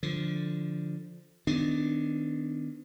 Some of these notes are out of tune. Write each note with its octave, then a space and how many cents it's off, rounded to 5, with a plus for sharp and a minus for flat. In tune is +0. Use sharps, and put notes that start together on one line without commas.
D3 +0 F3 +0
D#3 +0 B3 +35 D4 +0